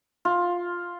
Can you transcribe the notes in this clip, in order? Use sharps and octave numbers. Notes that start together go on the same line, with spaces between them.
F4